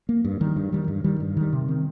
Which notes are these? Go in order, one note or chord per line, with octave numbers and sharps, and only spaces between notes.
A#3
G2
D#3 G3
G2
D#3 G3
G2
D#3 G3
G2
D#3 G3
C3
D#3 C4